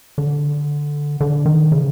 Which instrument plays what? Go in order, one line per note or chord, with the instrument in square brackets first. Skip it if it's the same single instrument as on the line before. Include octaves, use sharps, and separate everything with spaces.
[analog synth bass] D3
D3
D#3
C#3